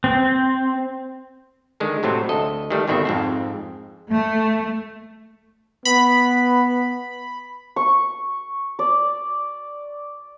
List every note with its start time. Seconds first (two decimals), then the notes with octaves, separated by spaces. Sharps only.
0.04 C4
1.80 D3 D#3 G#3
2.03 A2 C3 F#3 C4
2.29 D2 A4 D#5
2.70 D#3 G3 A3
2.88 G1 B2 D#3 C4 E5
3.05 F2 G#2 C4
4.10 A3
5.85 B3 B5
7.76 C#6
8.79 D5